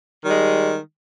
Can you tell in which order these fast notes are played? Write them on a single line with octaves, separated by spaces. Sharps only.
D#3 G3 G#3